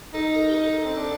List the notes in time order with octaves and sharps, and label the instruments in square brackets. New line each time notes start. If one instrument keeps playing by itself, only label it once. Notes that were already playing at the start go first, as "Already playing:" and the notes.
[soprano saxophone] D#4 [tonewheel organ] A4
[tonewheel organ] A#4
G4
[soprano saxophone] D#4 [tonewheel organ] A4
[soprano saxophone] C4
D4